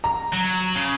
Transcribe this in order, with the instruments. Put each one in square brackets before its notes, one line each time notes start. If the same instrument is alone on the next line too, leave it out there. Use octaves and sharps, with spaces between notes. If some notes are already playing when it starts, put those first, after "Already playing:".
[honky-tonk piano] A#5
[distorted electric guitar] F#3
C#3